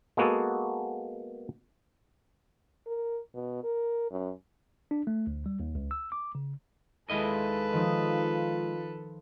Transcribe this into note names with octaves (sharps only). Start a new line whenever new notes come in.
G#3 A#3 B3 F#4 G#4 A4
A#4
B2
A#4
F#2
D4
A3
D2
G3
D#2
C#2
E6
D6
C#3
D#2 G#3 E4 F4 A4 B4 D#5 B6
D#3 F3 D#4 F4